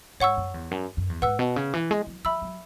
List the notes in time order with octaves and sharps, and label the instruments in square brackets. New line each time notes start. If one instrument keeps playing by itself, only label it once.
[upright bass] G#2 [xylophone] C#5 F#5 C#6 E6
[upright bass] F#2
E2
F#2
F#2
E2
[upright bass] G#2 [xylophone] B4 F#5 E6
[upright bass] B2
C#3
E3
G#3
F#3
[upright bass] F#3 [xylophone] E5 B5 E6
[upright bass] F#3